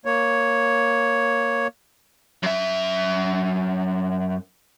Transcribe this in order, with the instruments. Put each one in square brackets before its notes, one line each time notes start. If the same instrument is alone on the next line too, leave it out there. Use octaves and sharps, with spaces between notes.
[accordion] A#3 C#5
[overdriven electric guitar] F#2 E5